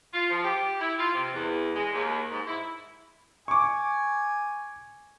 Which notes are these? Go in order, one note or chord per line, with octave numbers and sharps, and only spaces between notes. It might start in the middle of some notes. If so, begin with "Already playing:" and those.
F4
F3
G4
E4
F4
C3
E2
G#3
D#2
G#2
E4
G#5 C#6 D6